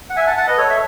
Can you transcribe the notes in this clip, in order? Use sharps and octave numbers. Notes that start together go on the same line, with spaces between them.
F#5
E5 G#5
F#5 A5
F#5 A5
B4 D#5
A4 C#5
E5